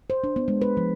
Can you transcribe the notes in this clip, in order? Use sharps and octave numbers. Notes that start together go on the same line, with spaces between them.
C5
D4
B3
G#3
B4
F3